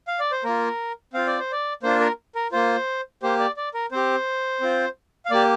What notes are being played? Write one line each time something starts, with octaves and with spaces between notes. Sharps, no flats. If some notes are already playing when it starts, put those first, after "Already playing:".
F5
D5
C5
A#3 F4 A#4
C4 F4 F5
D5
C5
D5
A#3 D4 F4 C5
A#4
A#4
A#3 F4 C5
A#3 G4 C5
D5
D5
A#4
C4 G4 C5
C4 F4
F5
A#3 G4 D5